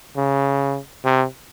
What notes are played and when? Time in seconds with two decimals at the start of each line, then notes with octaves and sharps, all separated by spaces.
0.17 C#3
1.04 C3